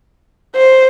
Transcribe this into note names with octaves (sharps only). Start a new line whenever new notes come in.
C5